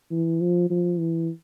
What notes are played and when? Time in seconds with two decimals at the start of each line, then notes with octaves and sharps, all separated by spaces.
0.11 E3
0.41 F3
0.70 F3
0.99 E3